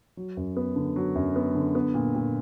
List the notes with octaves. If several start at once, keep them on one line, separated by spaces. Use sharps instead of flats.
F#3
F#2
B3
D3
F#3
F#2
B3
D3
B3
A#2
A#2